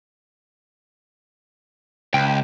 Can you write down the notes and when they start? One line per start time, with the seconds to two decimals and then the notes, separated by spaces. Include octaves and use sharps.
2.14 C#2 G5